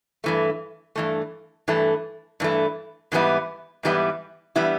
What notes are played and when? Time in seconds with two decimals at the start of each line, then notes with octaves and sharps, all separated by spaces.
0.24 G2 E3 A3
0.96 G2 E3 A3
1.68 G2 E3 A3
2.40 G2 E3 A3
3.12 G#2 E3 G3 B3 E4
3.83 G#2 E3 G3 B3 E4
4.56 E3 G3 B3 E4